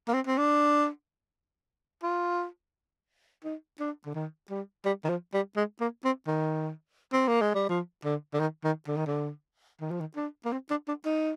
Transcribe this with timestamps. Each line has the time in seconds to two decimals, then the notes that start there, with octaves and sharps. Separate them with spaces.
0.08 A#3
0.14 C4
0.27 C4
0.38 D4
2.03 F4
3.45 D#4
3.80 D4
4.06 D3
4.15 D#3
4.50 G3
4.85 G3
5.04 D#3
5.09 F3
5.34 G3
5.57 G#3
5.81 A#3
6.05 C4
6.27 D#3
7.13 C4
7.28 A#3
7.42 G#3
7.55 G3
7.69 F3
8.05 D3
8.34 D3
8.40 D#3
8.64 D#3
8.88 D3
8.97 D#3
9.07 D3
9.81 D#3
9.91 F3
10.01 D#3
10.16 D4
10.45 A#3
10.52 C4
10.71 D4
10.88 D4
11.05 D#4